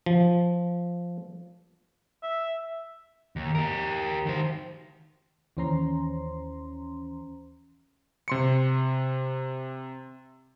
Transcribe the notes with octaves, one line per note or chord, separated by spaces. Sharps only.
F3
E5
D#2
G4 A#4
D#3 C5
D#2 E3 C#4 C5 A#5 C6
C3 C6 C#7